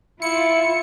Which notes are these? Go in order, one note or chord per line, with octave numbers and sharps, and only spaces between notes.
E4 F4 C#7